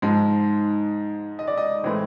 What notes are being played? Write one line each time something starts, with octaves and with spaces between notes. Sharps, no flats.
G#2 F3 G#3
D#5
D5
D#5
A2 E3 G#3 C4